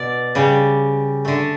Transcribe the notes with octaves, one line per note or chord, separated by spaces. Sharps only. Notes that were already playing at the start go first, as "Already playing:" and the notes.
Already playing: B2 D5
C#3 G3
D3 A3